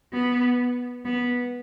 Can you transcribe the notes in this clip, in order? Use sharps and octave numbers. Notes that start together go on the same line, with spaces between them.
B3
B3